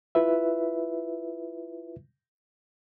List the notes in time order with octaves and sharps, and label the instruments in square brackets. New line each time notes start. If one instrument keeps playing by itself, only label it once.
[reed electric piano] E4 F4 B4 E5